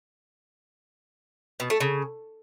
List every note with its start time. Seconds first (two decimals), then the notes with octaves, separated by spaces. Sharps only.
1.60 B2
1.70 A3
1.80 C#3